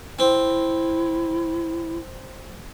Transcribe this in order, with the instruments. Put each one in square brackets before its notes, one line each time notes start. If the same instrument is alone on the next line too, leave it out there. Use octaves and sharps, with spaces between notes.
[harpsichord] C4 [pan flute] E4